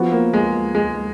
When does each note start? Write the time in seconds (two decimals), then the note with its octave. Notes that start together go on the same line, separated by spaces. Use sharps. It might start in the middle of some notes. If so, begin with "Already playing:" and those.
Already playing: F3 B3 F#4
0.12 A#3
0.33 G#3
0.75 G#3